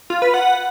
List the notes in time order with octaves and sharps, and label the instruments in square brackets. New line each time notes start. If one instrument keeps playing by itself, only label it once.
[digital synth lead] F4
B4
F#5